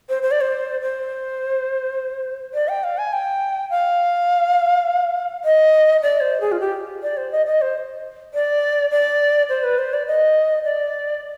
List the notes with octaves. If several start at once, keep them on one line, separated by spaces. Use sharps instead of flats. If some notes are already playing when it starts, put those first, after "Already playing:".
C5
C5
D5
C5
C5
D5
G5
F5
G#5
G5
F5
D#5
D5
C5
G#4
F4
G4
D5
C5
D#5
D#5
C5
D5
D5
C5
B4
C5
D5
D#5
D5